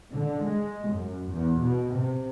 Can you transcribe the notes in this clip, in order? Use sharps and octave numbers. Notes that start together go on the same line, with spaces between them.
D3
G#3
F#2
E2
B2
C3